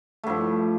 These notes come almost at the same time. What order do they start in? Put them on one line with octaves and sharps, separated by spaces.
A3 G2 F3